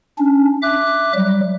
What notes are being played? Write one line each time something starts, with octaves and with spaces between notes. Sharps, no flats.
C#4 D4
E5 D6 F#6
F#3 G3